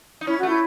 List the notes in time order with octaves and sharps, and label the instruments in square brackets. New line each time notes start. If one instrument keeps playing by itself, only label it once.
[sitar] D#4
[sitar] C#4 [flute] E4
[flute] F#4
[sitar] A3
[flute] E4